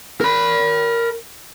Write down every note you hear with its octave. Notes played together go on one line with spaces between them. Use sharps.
A#4 B5